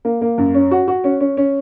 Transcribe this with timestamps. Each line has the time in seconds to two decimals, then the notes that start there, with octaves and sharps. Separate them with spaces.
0.05 A#3
0.21 A#3
0.38 F#2
0.54 C#4
0.71 F#4
0.88 F#4
1.04 C#4
1.20 C#4
1.37 C#4